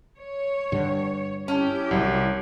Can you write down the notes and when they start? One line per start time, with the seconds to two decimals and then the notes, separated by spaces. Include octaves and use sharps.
0.19 C#5
0.72 G2 D3
1.48 C#4 E4 G4
1.91 C2 C3 F#3